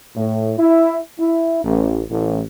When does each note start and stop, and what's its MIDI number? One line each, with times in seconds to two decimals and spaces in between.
0.16 0.53 45
0.58 0.97 64
1.20 1.59 64
1.63 2.02 33
2.10 2.41 33